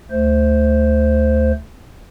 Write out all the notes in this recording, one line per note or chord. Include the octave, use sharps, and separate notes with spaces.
D2 A3 C5